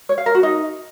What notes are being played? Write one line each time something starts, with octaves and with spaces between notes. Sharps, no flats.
C#5
F5
A#4
F#4
D#4